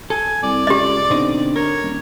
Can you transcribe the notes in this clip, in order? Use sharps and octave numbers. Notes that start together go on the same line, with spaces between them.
A4 G#5
C2 D5
C#2 G4 D#5
B2 D3 C4 D#4
A#4 C#5
D#1